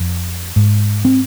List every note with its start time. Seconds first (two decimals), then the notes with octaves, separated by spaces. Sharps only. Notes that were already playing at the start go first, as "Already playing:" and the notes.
Already playing: F2
0.56 G#2
1.05 C4